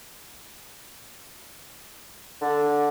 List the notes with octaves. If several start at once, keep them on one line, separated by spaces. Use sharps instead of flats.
D3